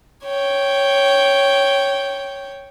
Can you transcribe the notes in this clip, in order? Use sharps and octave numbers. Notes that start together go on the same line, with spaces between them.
C#5 G5